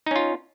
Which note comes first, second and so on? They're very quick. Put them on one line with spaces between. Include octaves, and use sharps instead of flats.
D#4 C#4 F4